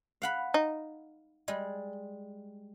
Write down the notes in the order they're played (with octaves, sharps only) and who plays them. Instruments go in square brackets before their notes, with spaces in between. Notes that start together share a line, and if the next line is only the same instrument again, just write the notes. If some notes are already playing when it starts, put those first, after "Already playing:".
[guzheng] F5 F#5 B5
[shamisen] D#4
[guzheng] G3 G#3